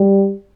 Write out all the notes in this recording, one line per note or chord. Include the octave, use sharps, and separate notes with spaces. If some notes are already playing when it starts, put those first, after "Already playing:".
Already playing: G3